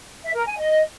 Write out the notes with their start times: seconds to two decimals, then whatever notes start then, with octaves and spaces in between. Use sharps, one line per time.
0.24 E5
0.35 A#4
0.47 G#5
0.58 D#5